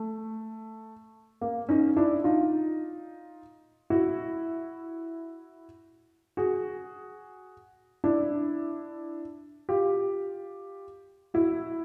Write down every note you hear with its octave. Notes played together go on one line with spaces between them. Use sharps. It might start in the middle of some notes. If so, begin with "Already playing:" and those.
Already playing: A3
A#3
C#4 D#4
D4 E4
D#4 F4
E4 F#4
F#4 G#4
D4 E4
F4 G4
E4 F#4